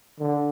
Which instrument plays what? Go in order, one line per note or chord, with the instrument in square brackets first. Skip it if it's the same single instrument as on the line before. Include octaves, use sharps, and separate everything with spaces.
[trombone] D3